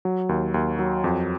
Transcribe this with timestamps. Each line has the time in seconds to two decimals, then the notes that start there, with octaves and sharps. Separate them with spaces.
0.05 F#3
0.29 D#2
0.54 D#2
0.79 F#3
1.04 F2